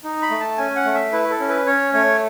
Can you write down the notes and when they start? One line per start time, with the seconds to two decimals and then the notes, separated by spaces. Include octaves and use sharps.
0.04 D#4
0.22 B5
0.31 A3
0.40 A5
0.58 C#4 G#5
0.76 F#5
0.85 A3
0.94 E5
1.12 E4 B4
1.30 A4
1.40 C#4
1.48 B4
1.66 C#4 C#5
1.93 A3 C#5